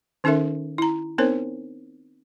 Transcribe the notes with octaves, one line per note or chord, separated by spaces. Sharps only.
D#3 C#4 D#4 A4 A#4 E5
E4 A#5
B3 C4 D#4 A#4 C5 C#5